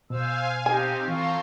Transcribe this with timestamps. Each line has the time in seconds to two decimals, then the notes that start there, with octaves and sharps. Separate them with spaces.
0.10 B2 C5 F5 G#5 E6
0.66 C4 D#4 G4 G#5
1.08 E3 F4 A4 F5 A#5 C6 C#6